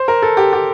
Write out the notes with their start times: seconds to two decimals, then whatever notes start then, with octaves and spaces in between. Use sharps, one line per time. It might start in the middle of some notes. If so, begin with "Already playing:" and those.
Already playing: C5
0.08 A#4
0.22 A4
0.37 G4
0.53 G4